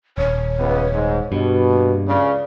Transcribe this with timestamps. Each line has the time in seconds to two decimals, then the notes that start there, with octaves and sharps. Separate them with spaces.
0.18 D#1 C#5
0.58 C#2 B3
0.93 G#2
1.32 G2 B2
1.68 A#3
2.07 C#2 C#3 D5